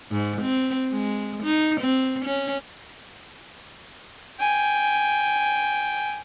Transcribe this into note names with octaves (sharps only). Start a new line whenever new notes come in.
G#2
C4
G#3
D#4
C4
C#4
G5 G#5